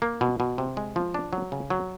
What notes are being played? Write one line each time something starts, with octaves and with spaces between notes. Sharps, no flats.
A#3
B2
B2
C3
G#3
F3
D4
F#3
C#3
F#3